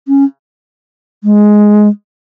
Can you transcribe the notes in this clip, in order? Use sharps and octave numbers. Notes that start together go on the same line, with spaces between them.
C#4
G#3